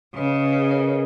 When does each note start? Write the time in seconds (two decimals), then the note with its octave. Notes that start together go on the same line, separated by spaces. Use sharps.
0.15 C#3 B4 D#5
0.34 B4 D#5
0.53 G#4 B4
0.71 A#4 C#5